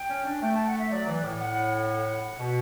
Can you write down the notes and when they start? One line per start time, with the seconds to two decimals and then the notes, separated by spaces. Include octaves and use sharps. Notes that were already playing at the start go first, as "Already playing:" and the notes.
Already playing: G5
0.10 C#4
0.25 D4
0.41 A3 G5
0.54 A5
0.67 F#5
0.79 E5
0.91 F#3 D5
1.07 E3
1.24 A2
1.40 F#5
1.89 F#5
2.39 B2